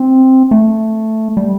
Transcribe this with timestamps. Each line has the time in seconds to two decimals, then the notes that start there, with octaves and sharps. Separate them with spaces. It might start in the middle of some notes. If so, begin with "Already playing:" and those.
Already playing: C4
0.51 A3
1.37 G3